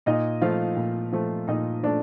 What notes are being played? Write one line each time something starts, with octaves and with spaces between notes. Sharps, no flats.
A#2 D#4 D#5
F3 A3 F4 F5
A#2
F3 A3
A#2 D#4 D#5
F3 A3 D4 D5